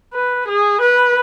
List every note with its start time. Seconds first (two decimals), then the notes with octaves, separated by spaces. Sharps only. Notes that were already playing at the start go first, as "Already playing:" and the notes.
0.14 B4
0.48 G#4
0.81 B4